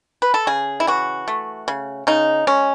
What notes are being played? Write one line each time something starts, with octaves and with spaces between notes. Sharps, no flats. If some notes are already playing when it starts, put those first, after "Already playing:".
B4
A4
C#3 G#4
E4
E3 F#4
A3
C#3
C#3 D#4
G#3 C#4